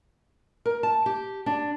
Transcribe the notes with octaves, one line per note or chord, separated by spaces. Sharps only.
A#4
A5
G4
D4